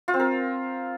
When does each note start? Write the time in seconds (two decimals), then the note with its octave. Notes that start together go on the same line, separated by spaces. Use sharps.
0.08 F4
0.14 C4
0.20 A#4